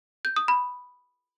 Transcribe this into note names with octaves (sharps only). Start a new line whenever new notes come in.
G6
D#6
B5